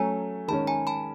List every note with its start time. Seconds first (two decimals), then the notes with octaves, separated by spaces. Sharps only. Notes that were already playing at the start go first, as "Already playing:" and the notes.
Already playing: F#3 A3 C#4 G#5 A#5
0.48 D#3 G#3 C#4 A5 B5
0.67 G#5 A#5
0.87 A5 B5